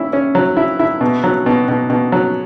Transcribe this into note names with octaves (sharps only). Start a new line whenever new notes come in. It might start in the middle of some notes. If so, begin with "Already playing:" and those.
Already playing: C#4 E4
C#4
F#3
E4
E4
B2
F#3
B2
B2
B2
F#3